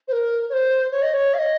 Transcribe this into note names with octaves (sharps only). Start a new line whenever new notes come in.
C5
A#4
C#5
C5
C#5
D#5
C#5
F5
D#5